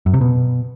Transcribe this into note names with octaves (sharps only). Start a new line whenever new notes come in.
F#2
C3
B2